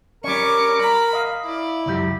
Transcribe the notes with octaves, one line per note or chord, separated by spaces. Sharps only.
G3 C#4 A#4 C#6 D6
A#5 B5
D#5 F5
E4 D5
C#2 F#2 G4